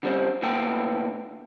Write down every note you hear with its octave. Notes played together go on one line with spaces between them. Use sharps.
D3 G3 C4 C#4
A2 D3 A#3 B3 G5